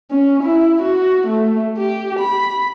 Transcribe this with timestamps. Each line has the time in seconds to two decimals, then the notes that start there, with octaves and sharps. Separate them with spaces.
0.11 C#4
0.44 E4
0.83 F#4
1.28 A3
1.79 G4
2.20 B5